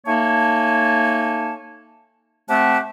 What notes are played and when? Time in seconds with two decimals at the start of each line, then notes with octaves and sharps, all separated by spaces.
0.06 A3 A#3 D#4 C#5 G#5 A5
2.49 C3 A3 C4 G4 F#5 A5